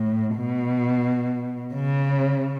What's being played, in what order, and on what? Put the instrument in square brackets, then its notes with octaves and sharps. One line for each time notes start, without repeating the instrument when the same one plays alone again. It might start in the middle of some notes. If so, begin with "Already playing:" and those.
Already playing: [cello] A2
B2
C#3